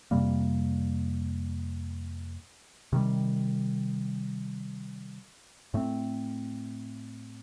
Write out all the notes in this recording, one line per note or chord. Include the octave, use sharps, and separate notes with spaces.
F2 C3 G3 A#3
C3 D#3 G3
A2 A3 C4